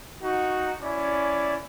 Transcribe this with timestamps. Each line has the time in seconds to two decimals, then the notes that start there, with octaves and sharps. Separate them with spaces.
0.23 D#4 F#4
0.82 C#4 E4 D5